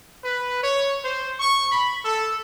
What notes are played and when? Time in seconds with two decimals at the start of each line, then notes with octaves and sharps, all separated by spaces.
0.23 B4
0.62 C#5
1.03 C5
1.39 C#6
1.71 B5
2.03 A4